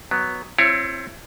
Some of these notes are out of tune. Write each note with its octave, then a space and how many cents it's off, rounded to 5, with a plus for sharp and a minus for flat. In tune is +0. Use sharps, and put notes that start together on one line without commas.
F#3 +0 B3 +0
C4 +20 E4 +35 C#5 +0